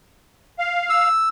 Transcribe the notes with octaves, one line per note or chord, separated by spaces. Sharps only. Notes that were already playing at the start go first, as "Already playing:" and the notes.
F5
E6